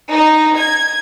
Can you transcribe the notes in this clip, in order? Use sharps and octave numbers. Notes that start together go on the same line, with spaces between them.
D#4
G#6